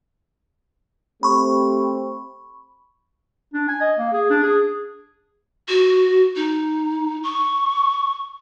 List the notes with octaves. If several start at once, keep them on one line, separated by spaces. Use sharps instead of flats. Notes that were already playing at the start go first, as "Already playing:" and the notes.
A3 C4 G4 B5 C#6
D4
G#5
D#5
A#3
G#4
D4
G#4
F#4
D#4
C#6